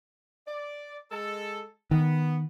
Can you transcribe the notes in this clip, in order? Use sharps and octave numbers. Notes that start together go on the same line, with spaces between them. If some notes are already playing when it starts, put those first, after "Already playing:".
D5
G#3 A4
D#3 B3